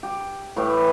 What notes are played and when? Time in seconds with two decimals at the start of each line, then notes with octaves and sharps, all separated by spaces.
0.03 G4
0.56 A2 E3 G4